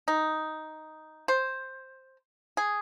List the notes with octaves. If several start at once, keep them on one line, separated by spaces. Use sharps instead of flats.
D#4
C5
G#4